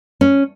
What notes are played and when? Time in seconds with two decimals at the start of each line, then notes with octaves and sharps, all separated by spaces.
0.21 C#4